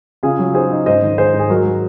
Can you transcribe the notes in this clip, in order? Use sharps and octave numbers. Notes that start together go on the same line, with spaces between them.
C#3 F4 G#4
F#3
D#4 G#4 C5
D#4
G#2 C5 D#5
D#3
D#4 G#4 C5
G#2
G#4
F#3 F#4 A#4
F#3